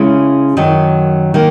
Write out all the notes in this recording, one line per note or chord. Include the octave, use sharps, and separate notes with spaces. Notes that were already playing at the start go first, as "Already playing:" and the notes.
Already playing: C#3 G#3 C#4 E4
F#2 D#3 F#3
D#3 A#3